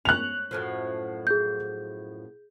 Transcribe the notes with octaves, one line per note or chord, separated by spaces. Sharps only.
C#4 F#6 F7
F#2 A2 F3
G#4 G6